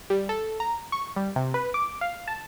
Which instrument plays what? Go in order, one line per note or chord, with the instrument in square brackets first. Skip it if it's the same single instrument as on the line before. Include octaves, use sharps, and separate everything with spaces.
[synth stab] G3
A4
A#5
C#6
G3
C3
B4
D6
F5
A5